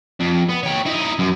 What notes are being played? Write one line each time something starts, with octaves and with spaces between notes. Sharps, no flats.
F2
B3
G4 C#5
D#4 E4
F#2